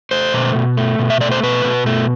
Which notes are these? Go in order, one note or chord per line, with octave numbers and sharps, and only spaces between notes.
A3 C5
B2
B2
A3
B2
E5
A3 D5
C5
B2 B4
B2
A3